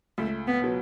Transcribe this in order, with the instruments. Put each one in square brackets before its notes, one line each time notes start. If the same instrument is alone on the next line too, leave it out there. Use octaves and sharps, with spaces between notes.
[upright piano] C#2 [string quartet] A3
[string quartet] B3
[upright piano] B2 F#3 B3